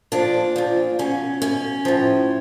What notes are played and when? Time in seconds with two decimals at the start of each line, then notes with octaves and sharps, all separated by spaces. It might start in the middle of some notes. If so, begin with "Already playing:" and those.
0.12 A#2 F3 D4
0.56 A#2 F3
0.99 B2 C#4
1.42 B2 C#4
1.85 A2 F3